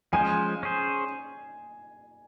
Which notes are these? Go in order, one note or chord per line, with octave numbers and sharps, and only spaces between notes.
F3 G#3 C#4 F4 C5 G#5
C#4 G#4 C5